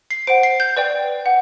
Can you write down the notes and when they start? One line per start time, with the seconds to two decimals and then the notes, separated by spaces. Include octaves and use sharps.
0.10 C7
0.27 C5 F#5 D7
0.43 C7
0.60 G6
0.77 B4 D5 G5
1.26 F#5